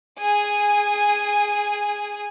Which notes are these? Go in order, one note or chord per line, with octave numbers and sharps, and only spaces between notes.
G#4 G#5